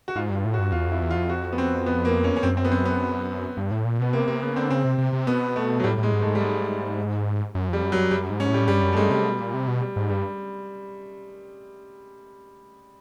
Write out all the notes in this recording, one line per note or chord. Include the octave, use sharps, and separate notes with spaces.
F#4
G#2 F4
G2 F4
A2
F#4
G2
E2 F4
F2 E4
E2
F4
F2
F#4
B3
C4
B3
A#3
C#4
C#4
F#2 C4
C4
B3
C4
B3
G2
A2
A#2
B2 B3
C3 A#3
C3 A#3
C#3 B3
D3 C4
C#3 C4
C3
C3
C3
B2 B3
A3
F#3
A2 G3
A2
G#3
G#2
A3
G#2
G3
G#3
F#2
F2 G3
F#2
F#3
F#2
F#2 G3
G#2
C#4
A2
G3
G2 G3
F#2
A3
G2 G#3
C3 G3
B2
A#2
C3
B2
G3
G#2
G2 G3